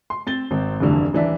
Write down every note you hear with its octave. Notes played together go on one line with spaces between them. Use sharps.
C6
C4 A6 G7
G#1 C4
F1 D2 G2 D3 E3
D#1 E3 D4 E5